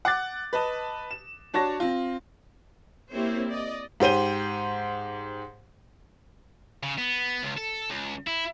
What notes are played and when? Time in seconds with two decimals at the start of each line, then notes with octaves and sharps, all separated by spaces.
0.05 F#5 D6 F#6 A6
0.53 B4 D#5 A5
1.11 E7
1.54 D4 F#4 C#5 A5 A#6
1.80 C4 F4
3.11 A#3 C4 E4 G4 C5 C#5
3.48 D5 D#5
4.00 G#2 G4 C5 D#7 G7
6.83 C#3
6.98 B3
7.43 C#2
7.57 A4
7.90 C#2
8.27 E4